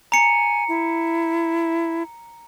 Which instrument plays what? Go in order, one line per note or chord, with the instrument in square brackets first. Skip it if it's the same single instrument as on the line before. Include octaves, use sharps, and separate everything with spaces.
[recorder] G#5 [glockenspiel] A#5 C#7
[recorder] E4